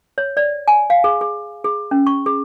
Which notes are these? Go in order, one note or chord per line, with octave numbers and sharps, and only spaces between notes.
C#5
D5
G#5
F5
G#4
G#4
G#4
C#4
C#6
G#4